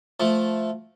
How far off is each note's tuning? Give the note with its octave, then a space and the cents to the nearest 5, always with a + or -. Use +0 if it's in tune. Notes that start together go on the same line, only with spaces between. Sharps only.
F3 +0 A3 -5